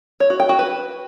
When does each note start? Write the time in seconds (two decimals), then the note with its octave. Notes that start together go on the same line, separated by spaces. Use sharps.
0.20 C#5
0.30 F#4
0.40 G5
0.49 F#4
0.59 B4